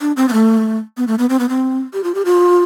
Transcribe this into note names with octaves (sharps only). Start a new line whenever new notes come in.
D4
C4
B3
A3
B3
A3
B3
C4
B3
C4
G4
F4
G4
F4